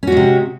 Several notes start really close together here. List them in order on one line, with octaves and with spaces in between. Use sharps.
C#4 F#4 G#3 C3